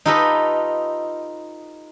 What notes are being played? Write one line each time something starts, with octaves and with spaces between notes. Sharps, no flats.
D#4 F4 G4 A4 B4 D#5